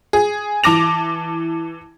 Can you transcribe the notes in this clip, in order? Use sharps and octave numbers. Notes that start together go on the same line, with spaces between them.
G#4
E3 A5 D6 A#6 F7